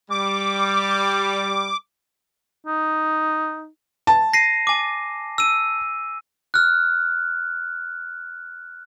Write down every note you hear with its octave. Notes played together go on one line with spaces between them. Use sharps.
G3 D6
D#4
A5
A#6 C7 D#7
G#5 D6
E6 D#7
F6 F#6